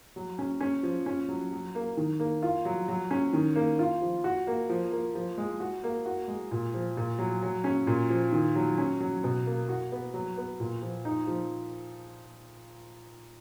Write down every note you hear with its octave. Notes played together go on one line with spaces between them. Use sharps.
F#3
C#4
C#4
F3
C#4
F#3
F#3
A#3
D#3
A#3
F4
F#3
F#3
C#4
D#3
A#3
F4
F3
F#4
A#3
F3
A#3
F3
G#3
F#4
A#3
F#4
G#3
A#2
F3
A#2
F#3
F#3
C#4
A#2
F3
D#3
F#3
C#4
F#3
B2
A#3
F#4
B3
F#3
B3
A#2
F3
D#4
F3